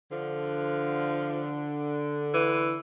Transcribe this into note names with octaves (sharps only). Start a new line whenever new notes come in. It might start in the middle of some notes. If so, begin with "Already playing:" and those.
D3 F3
E3